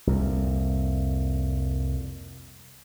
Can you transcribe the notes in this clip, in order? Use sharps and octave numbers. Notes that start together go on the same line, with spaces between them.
C2 F2 A#2